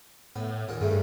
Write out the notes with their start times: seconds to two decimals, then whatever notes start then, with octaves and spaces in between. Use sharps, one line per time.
0.36 A2 B3
0.69 D#2 A#2 F#5
0.81 G2 C#3 A3